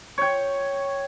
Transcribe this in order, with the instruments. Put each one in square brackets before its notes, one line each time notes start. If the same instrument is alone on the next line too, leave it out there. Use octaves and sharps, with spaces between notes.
[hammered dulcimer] C#5 G5